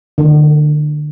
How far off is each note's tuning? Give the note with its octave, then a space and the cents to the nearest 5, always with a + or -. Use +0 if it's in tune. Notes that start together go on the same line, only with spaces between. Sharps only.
D3 +35